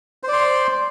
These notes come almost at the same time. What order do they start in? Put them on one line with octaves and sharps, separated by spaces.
C5 D5 C6